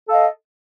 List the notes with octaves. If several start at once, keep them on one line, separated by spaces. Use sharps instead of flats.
A4 D#5 F5